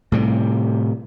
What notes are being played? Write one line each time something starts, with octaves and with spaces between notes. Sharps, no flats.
A2 C3 G3